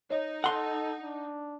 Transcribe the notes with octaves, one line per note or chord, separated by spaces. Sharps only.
D#4 C#5 D#5
A4 F#5 C6
D4